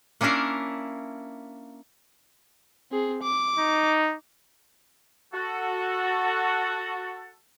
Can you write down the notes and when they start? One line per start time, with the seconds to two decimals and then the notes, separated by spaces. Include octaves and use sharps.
0.21 A#3 C#4 D4 E4 A#4 F5
2.92 C4 G#4
3.23 D6
3.59 D#4
5.33 F#4 A4